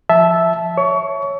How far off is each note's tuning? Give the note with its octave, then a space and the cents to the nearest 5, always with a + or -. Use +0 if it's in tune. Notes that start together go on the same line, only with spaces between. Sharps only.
F3 +0 E5 +0 A5 -15
C#5 +0 C#6 +25